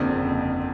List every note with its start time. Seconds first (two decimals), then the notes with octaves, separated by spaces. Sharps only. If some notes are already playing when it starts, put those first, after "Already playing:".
Already playing: G1 F2 C#3 F3 A#3 C4 D4